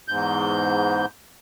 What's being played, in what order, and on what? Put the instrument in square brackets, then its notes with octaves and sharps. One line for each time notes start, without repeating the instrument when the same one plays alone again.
[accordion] E2 G#2 G6